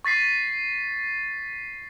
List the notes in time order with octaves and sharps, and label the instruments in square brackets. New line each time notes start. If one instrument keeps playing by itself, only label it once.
[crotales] C#6 A6 B6 C7